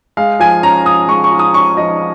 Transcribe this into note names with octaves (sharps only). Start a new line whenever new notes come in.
G#3 F5
F3 G#5
C#4 A#5
F3 D#6
G#3 C#6
C#6
F3
D#6
C#4 C#6
F3 D#5